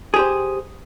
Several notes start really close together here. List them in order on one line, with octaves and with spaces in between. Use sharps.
G#4 G4 C5